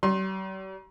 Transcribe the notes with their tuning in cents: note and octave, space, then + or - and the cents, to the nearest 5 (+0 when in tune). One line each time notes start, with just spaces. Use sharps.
G3 -45 C6 +30